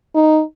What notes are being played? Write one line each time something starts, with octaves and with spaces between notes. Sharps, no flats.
D#4